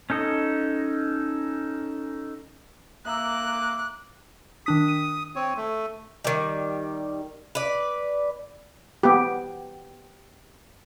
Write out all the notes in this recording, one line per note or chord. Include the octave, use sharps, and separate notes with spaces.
C#4 D#4 A4 D#5
A#3 E5 A#5 D6 E6 F#6
D#3 D4 D#6 B6
D#7
C4 C#5
A3
D#3 G3
B4 D5
B3 G4